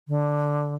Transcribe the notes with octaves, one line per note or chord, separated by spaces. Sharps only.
D3